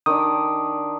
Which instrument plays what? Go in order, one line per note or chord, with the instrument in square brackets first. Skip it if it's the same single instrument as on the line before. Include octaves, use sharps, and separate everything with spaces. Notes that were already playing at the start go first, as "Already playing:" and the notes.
[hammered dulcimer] D#3 D4 D5 [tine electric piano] D#6